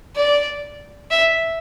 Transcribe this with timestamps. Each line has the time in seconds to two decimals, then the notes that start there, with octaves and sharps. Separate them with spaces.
0.16 D5
1.11 E5